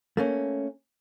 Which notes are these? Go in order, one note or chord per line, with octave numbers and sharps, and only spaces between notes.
A3 A#3 C#4